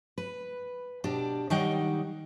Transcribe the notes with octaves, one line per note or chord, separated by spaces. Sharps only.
B4
B2 D4 G4
D#3 F#3 G3 D#4 F#5 G5